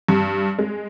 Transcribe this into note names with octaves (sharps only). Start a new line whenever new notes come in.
G2
G#3